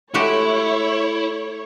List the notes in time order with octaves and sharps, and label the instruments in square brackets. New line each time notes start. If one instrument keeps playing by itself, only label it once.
[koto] G#3 F#4 G4 [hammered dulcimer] A3 [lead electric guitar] E4 [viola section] C#5